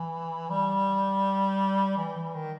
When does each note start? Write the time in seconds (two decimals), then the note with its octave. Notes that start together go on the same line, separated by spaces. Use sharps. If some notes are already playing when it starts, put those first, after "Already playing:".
Already playing: E3
0.50 G3
1.97 E3
2.16 E3
2.34 D#3